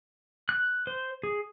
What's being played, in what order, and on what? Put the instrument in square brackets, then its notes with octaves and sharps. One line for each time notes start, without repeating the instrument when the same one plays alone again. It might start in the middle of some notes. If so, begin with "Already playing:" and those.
[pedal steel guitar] F#6
C5
G#4